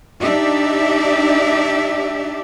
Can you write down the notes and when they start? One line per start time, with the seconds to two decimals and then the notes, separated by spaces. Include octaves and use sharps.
0.21 D4 D#4 G4 D5 E5